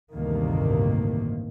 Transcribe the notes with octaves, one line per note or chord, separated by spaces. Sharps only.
A1 D2 G2 C3 D#3 A#3